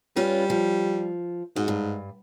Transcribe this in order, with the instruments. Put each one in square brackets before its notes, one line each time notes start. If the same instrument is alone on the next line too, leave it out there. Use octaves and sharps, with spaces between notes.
[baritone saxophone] G3 [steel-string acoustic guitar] C#4 F4 B4
[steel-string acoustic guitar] F3
[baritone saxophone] G#2 [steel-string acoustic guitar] F#4
[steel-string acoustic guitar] G2